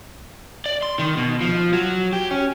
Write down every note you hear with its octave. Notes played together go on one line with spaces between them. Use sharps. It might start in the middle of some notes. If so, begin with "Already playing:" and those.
D5
C6
D#3
B2
F3
F#3
G4
C#4